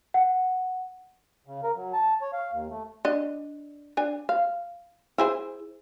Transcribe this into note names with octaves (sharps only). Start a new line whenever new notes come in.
F#5
C#3
A#4
F#3
A5
C#5
F5
D#2
A3
D4 D#5
D4 G#5
F5
E4 G#4 C5